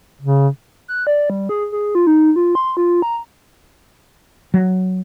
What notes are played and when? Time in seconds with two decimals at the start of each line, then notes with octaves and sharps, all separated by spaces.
0.21 C#3
0.88 F#6
1.07 D5
1.30 G3
1.49 G#4
1.72 G#4
1.95 F4
2.07 D#4
2.36 F4
2.55 C6
2.77 F4
3.02 A#5
4.54 F#3